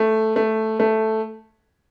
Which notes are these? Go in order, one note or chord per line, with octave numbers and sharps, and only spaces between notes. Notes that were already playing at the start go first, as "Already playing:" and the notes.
Already playing: A3
A3
A3